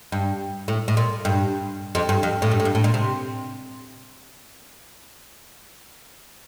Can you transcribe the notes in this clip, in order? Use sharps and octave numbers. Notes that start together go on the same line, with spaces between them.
G2
A2
A2
A#2
G2
F2
G2
F2
A2
G2
A2
G2
A2
A#2
C3